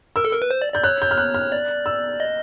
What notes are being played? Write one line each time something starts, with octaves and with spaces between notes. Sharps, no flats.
A#4 E6
A4
A#4
B4
C5
D5
D5 G6
C#5 F#6
G6
F6
F#6
F6
D5
E6
D#5